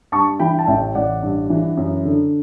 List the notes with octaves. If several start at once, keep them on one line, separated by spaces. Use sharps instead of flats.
G2 A5 C#6
E3 G5 B5
A5
A1 E5 G5
A1 D5 F#5
G2
E3
F#2
D3